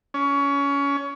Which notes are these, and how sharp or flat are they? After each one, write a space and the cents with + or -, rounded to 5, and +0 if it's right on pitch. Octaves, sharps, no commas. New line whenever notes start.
C#4 +20